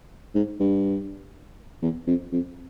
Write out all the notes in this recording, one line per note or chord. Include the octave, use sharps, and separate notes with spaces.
G#2
G2
E2
F2
F2